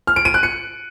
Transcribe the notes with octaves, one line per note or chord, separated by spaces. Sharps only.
F6
D7
D#7
F#6
C#7